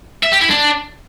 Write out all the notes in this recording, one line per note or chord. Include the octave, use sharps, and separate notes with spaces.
E5
G4
E4
D4